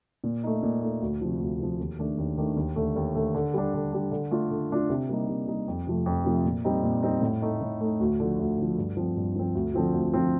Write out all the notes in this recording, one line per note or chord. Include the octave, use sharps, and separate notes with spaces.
A#2
A3 D#4
A#2
A3 D#4
D2
C3 F3
D2
C3 F3
D#2
D#3 A3 D4
D#2
D#3 A3 D4
D#2
D3 A3
D#2
D3 A3
D3
G3 D4
D3
G3 D4
D3
A3 D4 F4
D3
A3 D4 F4
C3
G3 A#3 D#4
C3
G3 A#3 D#4
F2
C3 F3 A3
F2
C3 F3 A3
A#2
G3 C4 D#4
A#2
G3 C4 D#4
A2
A3 D#4
A2
A3 D#4
D2
D3 F3
D2
D3 F3
G2
F3 C4
G2
F3 C4
D2
D3 F3 C4 F4
D2
D3 F3 C4 F4